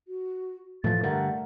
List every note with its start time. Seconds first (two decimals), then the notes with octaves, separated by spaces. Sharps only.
0.08 F#4
0.84 A2 E3 F3 A3 A6
1.04 G2 D3 A#4 F#5